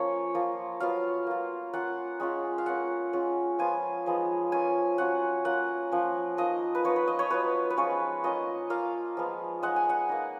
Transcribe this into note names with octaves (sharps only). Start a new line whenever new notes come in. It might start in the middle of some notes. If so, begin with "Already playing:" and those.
Already playing: F3 A#3 C#4 F4 C#5
F3 A#3 F4
F#3 B3 F4 F5
A#3 F4
A#3 C#4 F4 F#5
G#3 C#4 F4
F5
A#3 C#4 F4 F#5
G#3 C#4 F4
F3 B3 F4 G#5
F3 G#3 B3 D#4
A#3 C#4 F4 G#5
F#3 C#4 F4 F#5
A#3 C#4 F4 F#5
F3 A#3 C#4
F3 A#3 D#4 D#5
B4
F3 B3 D#4 C#5
B4
D#5
C#5
F#3 B3 F4 B4
B4
F3 G#3 C#4 F4 C#5
A#3 C#4 F4 D#5
A#3 F4 F5
F3 G#3 B3
G#3 D#4 F#5
G#5
F#5
A#3 D#4